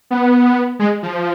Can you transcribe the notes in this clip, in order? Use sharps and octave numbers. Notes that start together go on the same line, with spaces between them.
B3
G#3
F3